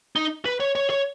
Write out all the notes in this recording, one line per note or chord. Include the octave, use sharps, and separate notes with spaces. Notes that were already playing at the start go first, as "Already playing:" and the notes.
D#4
B4
C#5
C#5
C#5